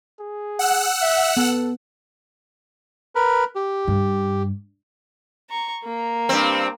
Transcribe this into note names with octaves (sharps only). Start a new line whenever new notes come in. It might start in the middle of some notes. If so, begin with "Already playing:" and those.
G#4
F#5 E6 F#6
E5
B3 A4
A#4 B4
G4
G2
A#5 C#6
A#3 A#5
G2 C4